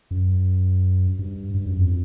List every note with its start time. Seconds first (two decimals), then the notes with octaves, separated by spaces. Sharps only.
0.11 F#2
1.19 G2
1.54 G2
1.66 F#2
1.78 F2